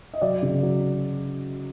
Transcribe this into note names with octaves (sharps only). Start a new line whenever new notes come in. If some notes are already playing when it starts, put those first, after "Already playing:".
D#5
F#3 D5
C#3
F#3